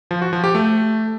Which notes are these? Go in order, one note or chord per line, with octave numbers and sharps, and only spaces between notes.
F3
F#4
F3
G4
A3